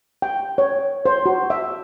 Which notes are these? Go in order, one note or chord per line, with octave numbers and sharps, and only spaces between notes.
G5
C#5
C5
F#4
E5